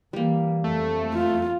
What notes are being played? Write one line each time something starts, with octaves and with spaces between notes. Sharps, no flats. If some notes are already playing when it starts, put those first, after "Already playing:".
E3 G3 A#3
F2 A3
F4